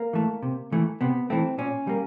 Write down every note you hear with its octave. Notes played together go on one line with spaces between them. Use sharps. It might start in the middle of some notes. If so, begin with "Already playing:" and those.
Already playing: A#3
E3 A3
C3
E3 A3
C3 B3
E3 A3 C4
A#2 C#4
G3 A#3